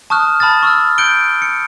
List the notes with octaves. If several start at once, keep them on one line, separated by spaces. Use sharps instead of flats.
A5 C#6 D#6 F6 F#6
A5 B5 D#6 F6 A6
C#6 E6 F6
F#6 G6 C#7 D7 G7
C#7